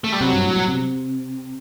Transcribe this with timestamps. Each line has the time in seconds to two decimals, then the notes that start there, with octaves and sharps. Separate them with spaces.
0.04 A3
0.12 G3
0.21 C3 F#3
0.33 G2
0.45 A2
0.57 B2
0.68 C3